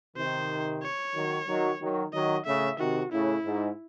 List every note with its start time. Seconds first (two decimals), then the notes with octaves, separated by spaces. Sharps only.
0.16 C3 D#3 C5
0.82 C#5
1.14 D#3 F#3
1.47 D#3 F#3
1.80 D#3 F#3
2.13 D#3 F#3 D#5
2.46 A2 C#3 E5
2.79 C3 D#3 F#4
3.12 A2 C#3 E4
3.45 G#2